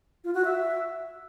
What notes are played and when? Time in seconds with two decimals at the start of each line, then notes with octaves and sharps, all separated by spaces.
0.24 F4
0.34 F#4
0.45 E5